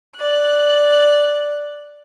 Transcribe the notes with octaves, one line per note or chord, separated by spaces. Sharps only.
D5 F#6